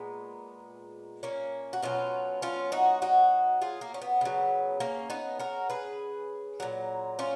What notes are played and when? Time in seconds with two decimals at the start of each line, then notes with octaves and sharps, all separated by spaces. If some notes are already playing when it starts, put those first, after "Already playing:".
Already playing: A#2 G#3 B3
1.23 A#3 C#4
1.73 F#4
1.82 B2 F#3 C#4 F4
2.42 C#4 F4
2.72 D#4 F#4
3.02 D#4 F#4
3.62 F4 G#4
3.81 A#3
3.94 C#4
4.02 B3
4.21 C#3 F#3
4.80 A#3 C#4
5.10 B3 D#4
5.39 F#4 A#4
5.70 G#4 B4
6.60 A#2 F#3
7.19 C#4 F4